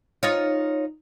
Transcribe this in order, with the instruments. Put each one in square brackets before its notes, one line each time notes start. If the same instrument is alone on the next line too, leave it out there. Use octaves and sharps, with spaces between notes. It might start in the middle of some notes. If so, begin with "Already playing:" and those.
[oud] D#4 F4 C#5